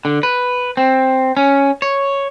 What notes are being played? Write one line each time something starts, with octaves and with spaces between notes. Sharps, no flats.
D3
B4
C4
C#4
C#5